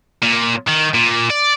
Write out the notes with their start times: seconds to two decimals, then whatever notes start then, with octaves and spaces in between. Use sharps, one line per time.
0.22 A#2
0.67 D#3
0.94 A#2
1.30 D5